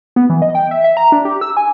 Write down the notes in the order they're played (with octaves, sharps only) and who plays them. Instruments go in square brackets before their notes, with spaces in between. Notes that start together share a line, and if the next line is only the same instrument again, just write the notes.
[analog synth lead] B3
E3
D#5
G5
E5
E5
A#5
D4
G4
E6
G#5